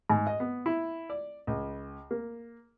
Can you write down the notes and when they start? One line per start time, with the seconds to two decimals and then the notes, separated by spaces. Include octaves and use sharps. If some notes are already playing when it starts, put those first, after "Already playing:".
0.10 G#2
0.27 D#5
0.40 B3
0.66 E4
1.10 D5
1.47 C#2
2.11 A#3